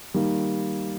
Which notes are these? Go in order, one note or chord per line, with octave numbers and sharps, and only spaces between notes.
D#3 G3 A#3